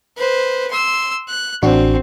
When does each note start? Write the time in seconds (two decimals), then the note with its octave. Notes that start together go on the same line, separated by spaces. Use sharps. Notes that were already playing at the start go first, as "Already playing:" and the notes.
0.17 B4 C5
0.71 C6 E6
1.28 F#6
1.63 A1 C4 D4 F#4